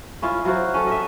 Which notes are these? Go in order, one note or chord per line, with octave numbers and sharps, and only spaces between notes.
C#4 E4 F4
F#3 F4 F#4 C5
C#4 A4
D#5 E5